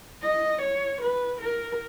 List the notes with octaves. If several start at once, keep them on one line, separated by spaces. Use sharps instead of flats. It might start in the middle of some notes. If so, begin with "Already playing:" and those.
D#5
C#5
B4
A#4